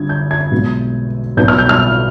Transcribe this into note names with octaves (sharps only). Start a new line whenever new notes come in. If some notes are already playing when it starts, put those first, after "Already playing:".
Already playing: G1 G2 D3 G3 D4 G#6
G6
G#6
B1 B2 G#3
B1 B2 B3 G6
F6
G6
F6